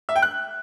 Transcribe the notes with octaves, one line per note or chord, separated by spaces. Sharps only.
E5
G5
F#6